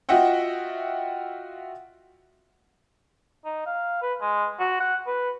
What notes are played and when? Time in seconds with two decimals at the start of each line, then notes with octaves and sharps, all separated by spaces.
0.09 F4 F#4 D#5 E5 F#5 G5
3.45 D#4
3.66 F5
4.02 B4
4.21 G#3
4.59 F#4
4.80 F#5
5.07 B4